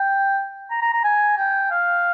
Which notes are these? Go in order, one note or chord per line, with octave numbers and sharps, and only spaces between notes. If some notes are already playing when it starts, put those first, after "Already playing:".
Already playing: G5
A#5
A#5
A#5
G#5
G5
F5